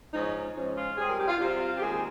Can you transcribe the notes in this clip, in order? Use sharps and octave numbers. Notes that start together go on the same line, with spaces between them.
G#2 F3 G#3 C#4 D#4
G#2 F3 G#3 C#4
F4
C3 G3 C4 G#4
A#4
G4
F4
C3 G3 C4 F4
F4
G4
D#2 D#3 G#3 C4 G#4